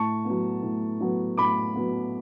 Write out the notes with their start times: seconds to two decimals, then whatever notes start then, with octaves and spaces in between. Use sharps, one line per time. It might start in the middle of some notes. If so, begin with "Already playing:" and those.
Already playing: A2 A5 C#6
0.25 F#3 B3
0.63 A2
1.01 F#3 B3
1.37 A2 B5 D6
1.76 F#3 B3